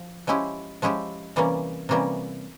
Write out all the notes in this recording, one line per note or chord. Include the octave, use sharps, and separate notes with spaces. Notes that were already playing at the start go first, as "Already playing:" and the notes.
Already playing: F3
F3 G#3 C#4 E4 G4
F3 G#3 C#4 E4 G4
C3 E3 G3 A#3 C#4
C3 E3 G3 A#3 C#4